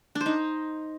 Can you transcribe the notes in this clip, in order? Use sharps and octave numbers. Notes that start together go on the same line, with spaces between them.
D4
C5
D#4